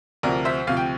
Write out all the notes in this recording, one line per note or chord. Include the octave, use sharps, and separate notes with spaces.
D2 C3 F3 A#4 D5
C5 E5
D2 C3 F3 F5
G5